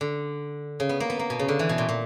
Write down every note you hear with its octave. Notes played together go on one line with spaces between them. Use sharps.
D3
C#3
B3
A#3
B3
A#3
B2
C#3
D3
E3
B2
A#2
A#2